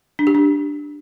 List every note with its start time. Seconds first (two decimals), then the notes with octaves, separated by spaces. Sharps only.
0.19 D4
0.27 G4
0.35 D4